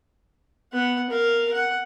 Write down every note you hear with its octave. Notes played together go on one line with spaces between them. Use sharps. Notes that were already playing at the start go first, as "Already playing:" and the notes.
B3 F#5
A#4 F5
F#5